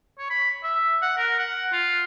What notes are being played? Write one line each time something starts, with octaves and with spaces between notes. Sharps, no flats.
C#5
B5
E5
F#5
A#4
F#5
F4